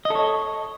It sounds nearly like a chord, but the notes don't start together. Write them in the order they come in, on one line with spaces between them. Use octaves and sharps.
D#5 A4 C#5